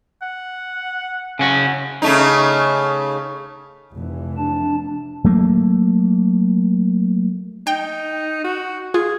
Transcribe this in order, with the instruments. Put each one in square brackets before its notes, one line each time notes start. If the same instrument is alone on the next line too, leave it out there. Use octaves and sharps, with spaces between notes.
[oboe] F#5
[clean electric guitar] C#3 C#4 F#4
[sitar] C#3 A3 D#4
[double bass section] F1 E3
[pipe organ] D4 A5
[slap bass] F#3 A3 A#3
[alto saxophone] D#4 [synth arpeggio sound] G5
[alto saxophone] F#4
[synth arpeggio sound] F4 [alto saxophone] G#4